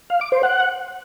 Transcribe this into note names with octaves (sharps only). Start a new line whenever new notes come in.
F5
D6
C5
F#5